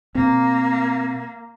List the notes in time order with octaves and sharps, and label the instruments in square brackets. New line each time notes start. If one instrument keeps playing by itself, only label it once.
[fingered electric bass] B2 C4 [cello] A#3